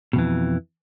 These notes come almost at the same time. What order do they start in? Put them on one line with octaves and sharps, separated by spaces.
B2 F2 E3